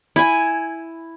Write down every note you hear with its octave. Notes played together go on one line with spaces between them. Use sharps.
E4 G#5